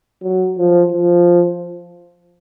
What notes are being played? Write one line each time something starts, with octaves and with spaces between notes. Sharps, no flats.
F#3
F3
F3